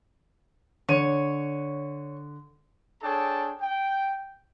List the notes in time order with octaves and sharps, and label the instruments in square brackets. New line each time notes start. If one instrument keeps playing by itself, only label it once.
[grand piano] D3 D#7 [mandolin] C#5
[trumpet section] D4 G#4 A4 C#5 G5 A5
G5